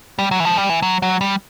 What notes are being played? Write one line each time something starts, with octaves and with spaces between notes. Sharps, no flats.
G3
F#3
E3
F3
G3
E3
F#3
F#3
G3